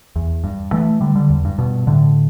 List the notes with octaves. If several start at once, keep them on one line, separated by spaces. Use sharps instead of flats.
E2
G2
E3 A3
D3 G3
D3 G3
E2
G2
G2 B2
A2 D3